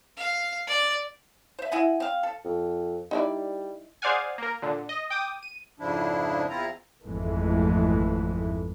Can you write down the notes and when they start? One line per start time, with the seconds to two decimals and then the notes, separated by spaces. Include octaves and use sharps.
0.17 F5
0.67 D5
1.59 C5 E5
1.72 E4 D#5 F#5 G#5
2.00 C4 F5
2.23 A4
2.44 F2
3.11 G3 D#4 E4 D5
4.02 G#4 C5 D5 F5 F#5 G#5
4.38 A#3 A#4
4.62 A#2 D3
4.89 D#5
5.10 G5 D6 D#6
5.43 D#7
5.80 F2 G#2 C#3 F3 D4 E4
6.49 E2 C4 E4 F4 A#5
7.04 G#1 F2 E3 G#3 A3